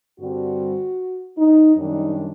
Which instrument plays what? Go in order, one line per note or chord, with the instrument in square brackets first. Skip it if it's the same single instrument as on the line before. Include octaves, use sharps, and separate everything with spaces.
[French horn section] G2 D3 G3 C4 F#4
D#4
F#2 D#3 G3 D4 D#4